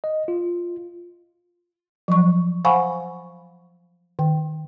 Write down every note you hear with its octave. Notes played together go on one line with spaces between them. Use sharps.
D#5
F4
F3 F#3 C#6
C5 F5 F#5 G#5 B5 C#6
D#3 G5